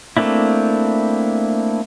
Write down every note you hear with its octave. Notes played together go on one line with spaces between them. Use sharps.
A3 A#3 C4 D4 E4